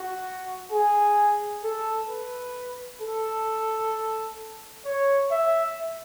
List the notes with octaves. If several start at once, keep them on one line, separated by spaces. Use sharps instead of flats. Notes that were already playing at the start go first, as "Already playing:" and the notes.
Already playing: F#4
G#4
A4
B4
A4
C#5
E5